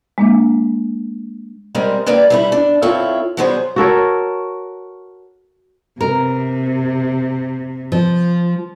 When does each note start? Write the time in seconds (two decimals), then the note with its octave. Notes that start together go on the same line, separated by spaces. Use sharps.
0.18 G#3 A#3 D4
1.75 G3 G#3 C4 A#4
2.06 G3 A#3 B4 D5 G5
2.30 G3 A3 E4
2.52 D4
2.82 G2 C4 E4 F4 A4 C#5
3.37 F#3 G3 B3 E4 G#4 C5
3.76 F#4 A4 A#4 C#5
6.01 C3 A#4
7.92 F3